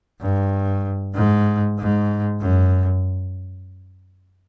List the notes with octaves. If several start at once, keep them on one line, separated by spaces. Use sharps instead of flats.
G2
G#2
G#2
F#2